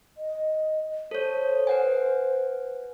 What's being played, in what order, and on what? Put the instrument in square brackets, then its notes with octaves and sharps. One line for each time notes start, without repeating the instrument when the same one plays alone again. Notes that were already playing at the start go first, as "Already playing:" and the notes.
[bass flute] D#5
[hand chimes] A4 C#5 [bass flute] C5
[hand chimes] B4 F#5 G#5